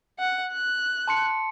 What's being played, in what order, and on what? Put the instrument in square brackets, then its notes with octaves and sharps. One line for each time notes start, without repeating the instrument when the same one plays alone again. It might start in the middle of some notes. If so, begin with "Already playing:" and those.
[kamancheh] F#5
F#6
[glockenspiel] A5 C6 C#7